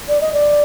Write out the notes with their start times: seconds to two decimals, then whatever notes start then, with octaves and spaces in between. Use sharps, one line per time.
0.08 D5
0.21 D#5
0.33 D5